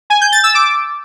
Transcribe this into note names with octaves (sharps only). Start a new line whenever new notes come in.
G#5
G6
A6
E6
D6